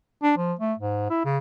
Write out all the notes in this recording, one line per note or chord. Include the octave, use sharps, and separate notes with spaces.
D4
F3
A3
G#2
E4
C#3